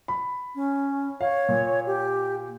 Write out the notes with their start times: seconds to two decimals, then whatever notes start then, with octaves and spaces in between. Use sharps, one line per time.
0.08 B5
0.55 C#4
1.21 C#5 F5
1.48 A#2
1.86 G4